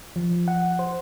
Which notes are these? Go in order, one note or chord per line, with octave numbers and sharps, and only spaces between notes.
F3
F#5
C5